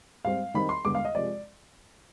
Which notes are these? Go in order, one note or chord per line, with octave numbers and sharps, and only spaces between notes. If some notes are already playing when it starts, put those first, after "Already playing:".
G#2 G3 C4 F5
D#3 G3 C4 D#4 B5
C6
G2 D3 G#3 B3 D6
F5
D#5
C3 F3 G#3 D5